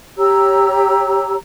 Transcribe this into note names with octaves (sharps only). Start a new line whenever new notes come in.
G4 C#5 A#5 E6